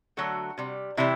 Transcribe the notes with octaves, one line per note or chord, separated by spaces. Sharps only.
D3 F#3 A3 F#4
C3 G3
C3 E3 G3 E4